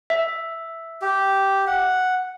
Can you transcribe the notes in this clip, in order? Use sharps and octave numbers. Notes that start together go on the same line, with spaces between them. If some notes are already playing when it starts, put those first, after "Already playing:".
E5
G4
F#5